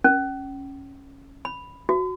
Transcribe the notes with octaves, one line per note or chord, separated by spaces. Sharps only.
C#4
B5
F#4